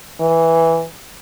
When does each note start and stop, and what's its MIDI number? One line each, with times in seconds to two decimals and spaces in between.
0.20 0.84 52